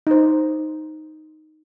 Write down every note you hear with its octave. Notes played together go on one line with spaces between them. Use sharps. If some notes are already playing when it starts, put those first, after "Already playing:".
D#4 C5